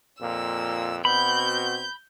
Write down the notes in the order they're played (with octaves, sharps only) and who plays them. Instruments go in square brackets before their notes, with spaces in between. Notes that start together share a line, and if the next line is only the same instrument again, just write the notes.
[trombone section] F2 A#2 [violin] E6
[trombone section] B2 C4 F#4 [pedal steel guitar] B5 [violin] G6